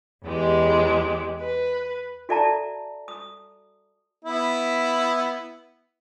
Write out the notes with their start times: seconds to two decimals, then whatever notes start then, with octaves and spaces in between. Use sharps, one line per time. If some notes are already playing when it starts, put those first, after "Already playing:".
0.24 E2 G#3 G4
1.40 B4
2.29 F#4 A4 D5 E5 A5 A#5
3.08 D#6
4.25 B3 E4